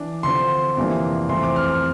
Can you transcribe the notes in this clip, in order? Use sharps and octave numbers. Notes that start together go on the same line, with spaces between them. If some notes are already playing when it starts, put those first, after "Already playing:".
Already playing: E3 D4
D3 F3 C4 C6
F2 C3 E3 A#3 D4
F2 E3 A3 C4 C6
D6
F6
F6